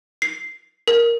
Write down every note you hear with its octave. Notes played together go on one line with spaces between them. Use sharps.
C7
A#4